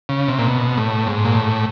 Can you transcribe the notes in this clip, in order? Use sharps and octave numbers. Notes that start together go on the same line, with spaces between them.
C#3
C3
A#2
B2
A2
G#2
A#2
A2